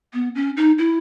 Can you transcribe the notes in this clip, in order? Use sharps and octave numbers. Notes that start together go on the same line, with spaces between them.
B3
C#4
D#4
E4